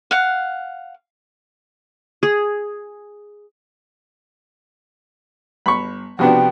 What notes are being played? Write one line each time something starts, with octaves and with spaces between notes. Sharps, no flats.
F5 F#5
G#4
G1 B5 C#6
C3 F3 B3 D4 F#4 G5